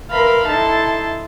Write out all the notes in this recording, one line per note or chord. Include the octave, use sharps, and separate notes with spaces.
A#4 B4 E5 F5 B5 C6
D#4 E4 A4 A5 C6